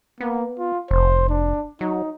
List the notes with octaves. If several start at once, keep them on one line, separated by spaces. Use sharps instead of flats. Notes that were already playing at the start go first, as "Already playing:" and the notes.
A#3 B3
F4
F1 C5
D4
F#3 D#4